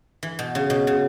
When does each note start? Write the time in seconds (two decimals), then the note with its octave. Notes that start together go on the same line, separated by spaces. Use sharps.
0.23 E3
0.39 B2
0.55 C#3
0.70 B2
0.87 C#3